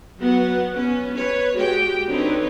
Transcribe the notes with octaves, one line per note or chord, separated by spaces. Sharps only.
F#3 B3 F#4 F#5
B3 C#4
B4 C#5
G#3 F#4 G4 G5
D3 C4 D#4 B4 C#5